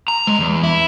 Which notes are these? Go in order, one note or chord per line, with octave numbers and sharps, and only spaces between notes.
A#5
G#3
E2
E4